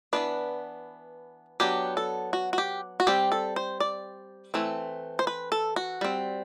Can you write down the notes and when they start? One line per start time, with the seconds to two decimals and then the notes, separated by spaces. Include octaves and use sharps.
0.13 E3 B3 D4 B4
1.60 F#3 B3 D4 G4
1.97 A4
2.33 F#4
2.53 F#4
2.58 G4
3.00 F#4
3.07 G3 C4 G4
3.32 A4
3.56 C5
3.80 D5
4.54 E3 A3 C4
5.19 C5
5.27 B4
5.52 A4
5.76 F#4
6.01 G3 C4